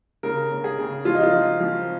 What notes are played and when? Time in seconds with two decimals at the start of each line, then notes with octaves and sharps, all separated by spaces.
0.23 C#3 A#4
0.51 C#3
0.64 G#4
0.79 C#3
1.05 F3 F4
1.15 D#4
1.23 F4
1.34 F3
1.61 F3